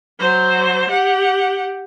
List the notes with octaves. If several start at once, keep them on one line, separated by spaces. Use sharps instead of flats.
F#3 C5
G4 F#5